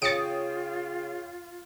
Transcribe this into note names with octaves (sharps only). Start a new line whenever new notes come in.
C#3 F4 C#5 G5 D#6 A6 C#7 D7